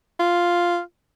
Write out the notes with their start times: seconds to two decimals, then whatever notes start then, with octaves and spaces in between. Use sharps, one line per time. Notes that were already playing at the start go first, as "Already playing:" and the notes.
0.20 F4